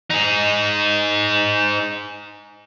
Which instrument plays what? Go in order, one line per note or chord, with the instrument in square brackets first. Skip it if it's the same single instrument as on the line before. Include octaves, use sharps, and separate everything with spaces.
[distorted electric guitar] D#4 G#4